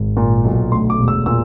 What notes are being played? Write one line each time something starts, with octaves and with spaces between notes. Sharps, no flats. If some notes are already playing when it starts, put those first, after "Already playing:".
Already playing: G#1
A#2
B1
D2 C6
D6
E1
E6
A#2 E6